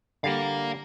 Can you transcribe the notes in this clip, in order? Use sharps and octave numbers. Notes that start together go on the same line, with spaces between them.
D3 G3 A#4 F5